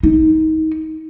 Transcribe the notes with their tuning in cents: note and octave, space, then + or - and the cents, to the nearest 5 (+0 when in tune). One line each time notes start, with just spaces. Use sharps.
D#4 +25